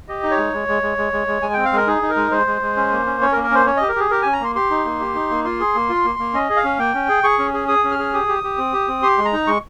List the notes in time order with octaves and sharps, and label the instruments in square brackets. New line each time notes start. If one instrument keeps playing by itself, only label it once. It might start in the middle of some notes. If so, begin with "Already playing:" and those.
[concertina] G4 D#5
D#4
C#5
G#3
G#3
G#3
G#3
G#3
G#3
G#3
G#3 G#5
C4 G5
F5
G#3 A#4
D#4 G#4
D#4
A#4
G#3
G#3 C5
G#3
G#3
C#4
A#3
C#4
C#4 C#5
A#4
A#3
A#4
C#4 C5
C#4 C#5
G4 D#5
A#4
G4 G#4
G4 A#4
C#4 G#5
A#5
A#3 C6
G4 C6
D#4
A#3
G4
D#4
A#3
F4 C6
G#4
A#3
F4
A#3
A#3
C#4 D#5
G#4
F5
C#4
A#3 G5
C#4
G#4
G#4 C#6
C#4
G#4
G#4 D#6
C#4
F6
G#4
G4 D#6
G4
G4
C4
G4
C4
G4 C6
G#3
A#5
D#4
G#3 C#6